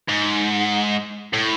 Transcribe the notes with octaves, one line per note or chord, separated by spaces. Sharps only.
G#2
A2